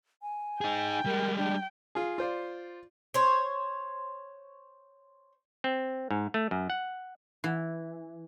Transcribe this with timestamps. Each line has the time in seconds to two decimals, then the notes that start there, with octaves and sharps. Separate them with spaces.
0.22 G#5
0.61 D#4 G#4 G5
1.06 G3 G#3 A#4
1.37 D4 G5
1.95 F4 G#4
2.18 F4 C5 D5
3.14 C5 C#5
5.64 C4
6.11 G#2
6.34 A3
6.51 F#2
6.70 F#5
7.44 E3